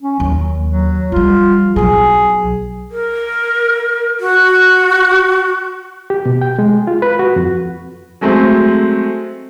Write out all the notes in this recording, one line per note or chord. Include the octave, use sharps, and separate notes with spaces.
C#4
D#2 F#3
F#3
F3 G3 F4
B1 F#3 G#4
A#4
F#4
G4
B2
G5
G#3
F4
B4
F#4
F2
F#3 G#3 A3 C4